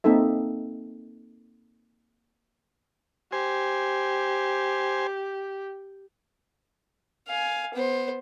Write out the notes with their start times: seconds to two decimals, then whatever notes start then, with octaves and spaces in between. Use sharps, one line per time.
0.04 A#3 C4 D#4 A4 E5
3.32 G4 C5 G#5
7.28 F5 G#5
7.74 B3 C5